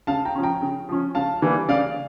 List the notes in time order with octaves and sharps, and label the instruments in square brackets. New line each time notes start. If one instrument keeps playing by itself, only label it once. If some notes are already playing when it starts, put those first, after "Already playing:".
[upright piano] C#3 [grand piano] F5 A5
[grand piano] G5 A#5
[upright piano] F3 C#4
[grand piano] G5 A#5
[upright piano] C#3
F3 C#4
[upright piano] C#3 [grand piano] F5 A5
[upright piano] E3 G3 A#3 D4
[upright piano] C#3 [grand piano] D5 F5